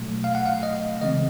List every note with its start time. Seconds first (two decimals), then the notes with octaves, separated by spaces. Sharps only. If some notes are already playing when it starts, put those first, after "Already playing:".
Already playing: B2 F#3 A3
0.24 F5
0.35 F#5
0.46 F5
0.63 D#5
1.01 C#3 E3 G#3 C4 D#5